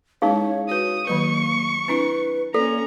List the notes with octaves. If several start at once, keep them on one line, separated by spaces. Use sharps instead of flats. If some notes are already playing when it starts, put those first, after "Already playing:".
G#3 C#4 D#4 E4 G#4 C#5 F5
F#4 B4 C#5 D#6
D#3 F#3 A#3 B4 C#6
C4 D4 E4 B4
A#3 C#4 A4 D5 A#5